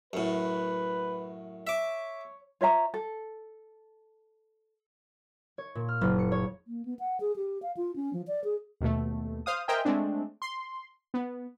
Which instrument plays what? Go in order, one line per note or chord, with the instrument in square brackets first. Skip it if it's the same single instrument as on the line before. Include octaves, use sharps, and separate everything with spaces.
[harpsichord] F#2 A2 [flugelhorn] B4
[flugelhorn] C#5 [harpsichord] E5 D6
[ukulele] F4 C#5 E5 A#5
A4
[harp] C#5
A#2
F6
F#1
C#7
C#5
[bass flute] A#3
B3
F#5
G#4
G4
F5
F4
C#4
F3
D5
G#4
[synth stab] D#2 B2 A3
C5 F5 D#6
A#4 C5 D#5 E5 G5 G#5
G#3 A3 C4 D4
C6
B3